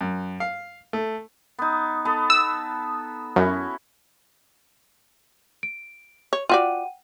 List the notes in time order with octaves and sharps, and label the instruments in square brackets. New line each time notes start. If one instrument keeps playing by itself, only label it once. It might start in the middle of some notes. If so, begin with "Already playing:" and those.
[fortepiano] F#2
F5
A3
[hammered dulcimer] B3 D#4
B3 A4
[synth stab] E6
[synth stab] F#2 [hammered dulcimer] C#4 E4 F#4
[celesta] D7
[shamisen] C#5
[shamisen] F4 F#4 D5 [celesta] F#5 G5 D#7